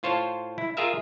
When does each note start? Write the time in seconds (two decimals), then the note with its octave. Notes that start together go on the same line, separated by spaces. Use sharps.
0.03 A2 F4 C5 C#5 F5 A5
0.58 E4
0.77 F4 G#4 A#4 E5 F5